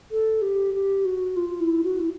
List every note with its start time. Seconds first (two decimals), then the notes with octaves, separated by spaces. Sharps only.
0.11 A4
0.42 G4
0.74 G4
1.05 F#4
1.37 F4
1.60 E4
1.84 F#4
2.00 E4